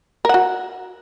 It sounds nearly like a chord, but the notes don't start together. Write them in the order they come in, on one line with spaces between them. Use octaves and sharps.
A#4 F#5 F#4